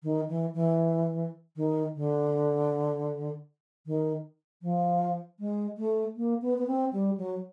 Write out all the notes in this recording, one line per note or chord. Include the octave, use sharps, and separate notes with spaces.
D#3
E3
E3
D#3
D3
D#3
F3
G#3
A3
A#3
B3
B3
C4
G3
F#3